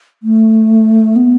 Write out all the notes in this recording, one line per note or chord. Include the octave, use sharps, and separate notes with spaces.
A3
B3